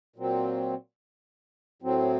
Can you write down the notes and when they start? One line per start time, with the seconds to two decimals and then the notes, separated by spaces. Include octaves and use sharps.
0.16 A#2 F#3 C4
1.82 A2 F#3 C4